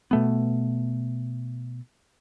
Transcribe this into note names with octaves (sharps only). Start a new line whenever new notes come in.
B2 A3 B3